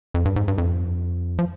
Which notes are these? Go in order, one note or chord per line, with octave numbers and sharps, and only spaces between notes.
F2
G2
G#2
G2
F2
F3